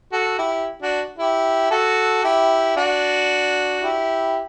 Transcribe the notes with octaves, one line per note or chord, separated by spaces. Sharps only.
F#4 A4
E4 G4
D4 F#4
E4 G4
F#4 A4
E4 G4
D4 F#4
E4 G4